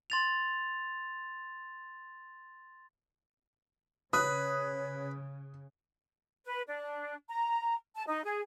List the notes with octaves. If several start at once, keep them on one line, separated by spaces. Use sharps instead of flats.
C6 A6 F7
C#3 B4 C#5 D#6 F#6
B4
D4
A#5
A5
D#4
G#4